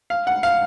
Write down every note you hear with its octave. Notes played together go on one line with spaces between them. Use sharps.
F5
F#5
F5